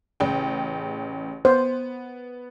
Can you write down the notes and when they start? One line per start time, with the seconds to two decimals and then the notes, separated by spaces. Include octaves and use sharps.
0.20 A1 C#3 G5
1.45 B3 C5